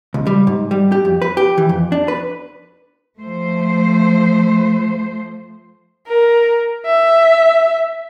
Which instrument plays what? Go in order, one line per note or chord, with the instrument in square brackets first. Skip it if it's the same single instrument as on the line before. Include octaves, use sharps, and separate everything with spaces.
[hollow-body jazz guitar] C#2
G3
G#2
G3
G4
F2
B4
G4
E3
F2
D4
B4
[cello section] F3 A3 C5
[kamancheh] A#4
E5